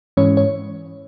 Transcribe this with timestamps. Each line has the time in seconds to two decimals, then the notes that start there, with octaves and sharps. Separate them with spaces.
0.17 G#2 E3 G#3 C#4 C#5
0.37 C#5